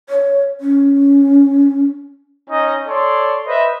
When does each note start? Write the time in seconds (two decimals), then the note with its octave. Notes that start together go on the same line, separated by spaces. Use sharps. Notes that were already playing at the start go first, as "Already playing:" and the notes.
0.09 C#5
0.61 C#4
2.48 C#4 D#4 D#5
2.87 A4 C#5 D5 C6
3.45 B4 C5 D#5 E5